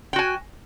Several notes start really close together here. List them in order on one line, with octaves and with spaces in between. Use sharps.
G5 F#4 G#5